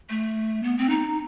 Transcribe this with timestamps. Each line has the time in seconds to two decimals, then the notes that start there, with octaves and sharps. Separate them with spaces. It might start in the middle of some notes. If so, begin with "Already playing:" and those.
0.10 A3
0.63 B3
0.78 C4
0.90 D#4